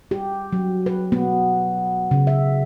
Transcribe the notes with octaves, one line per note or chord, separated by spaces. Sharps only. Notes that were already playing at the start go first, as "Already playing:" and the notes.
G4
F#3
B4
B3
C#3
E5